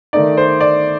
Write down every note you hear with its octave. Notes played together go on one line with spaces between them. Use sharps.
D#3 A3 D#4 D5
C5
D5